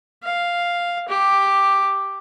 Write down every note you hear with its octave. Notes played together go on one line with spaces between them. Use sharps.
F5
G4